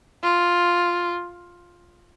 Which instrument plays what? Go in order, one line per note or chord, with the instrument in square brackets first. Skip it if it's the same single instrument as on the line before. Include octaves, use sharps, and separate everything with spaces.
[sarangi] F4